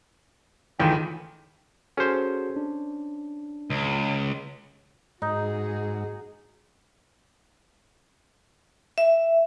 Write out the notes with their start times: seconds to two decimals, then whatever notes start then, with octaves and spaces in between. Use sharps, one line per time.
0.80 C#2 D#3 E3 A3 F4 G5
1.97 C#4 F#4 G#4 A4 C5
2.56 D4
3.70 C#2
5.22 G#2 D#4 F#4 G#4
8.98 E5